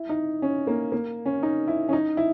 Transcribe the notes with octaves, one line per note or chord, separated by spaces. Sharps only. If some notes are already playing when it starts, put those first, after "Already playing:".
Already playing: E4
D#4
C#4
A#3
A#3
C#4
D#4
E4
C#4
D#4
E4